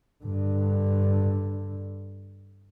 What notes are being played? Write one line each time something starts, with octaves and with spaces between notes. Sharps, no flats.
G2 D3